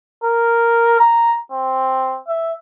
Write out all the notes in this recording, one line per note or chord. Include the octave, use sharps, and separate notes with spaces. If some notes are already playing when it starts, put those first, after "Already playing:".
A#4
A#5
C4
E5